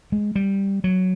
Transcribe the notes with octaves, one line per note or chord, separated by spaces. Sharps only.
G#3
G3
F#3